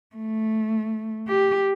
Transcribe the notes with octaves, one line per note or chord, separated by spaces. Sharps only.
A3
G4